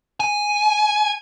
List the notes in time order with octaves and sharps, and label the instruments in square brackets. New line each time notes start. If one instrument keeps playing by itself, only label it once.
[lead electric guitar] G#5